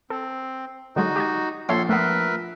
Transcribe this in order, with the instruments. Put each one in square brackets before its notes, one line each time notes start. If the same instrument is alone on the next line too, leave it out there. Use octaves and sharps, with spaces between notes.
[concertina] C4 [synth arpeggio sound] A4
[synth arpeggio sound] D3 F#3 G#3 [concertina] D#4 F#4
[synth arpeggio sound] G4 D#5 G#5
[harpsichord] A#1 [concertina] A4 C6 [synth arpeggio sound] C#5 E5
[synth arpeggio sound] A3 B3 [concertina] A#4 B4 E5